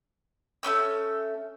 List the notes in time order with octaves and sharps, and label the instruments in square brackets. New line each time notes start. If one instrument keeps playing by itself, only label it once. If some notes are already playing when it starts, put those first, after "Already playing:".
[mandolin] A3 B3 C#4 E6